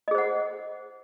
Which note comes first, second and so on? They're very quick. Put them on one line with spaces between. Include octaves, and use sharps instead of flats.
D#5 G#4 C5 F#5